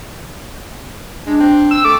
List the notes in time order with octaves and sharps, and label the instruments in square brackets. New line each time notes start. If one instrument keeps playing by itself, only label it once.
[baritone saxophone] G#3 [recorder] D4
[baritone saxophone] C4
[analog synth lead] E6
[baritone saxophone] A3 [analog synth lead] D6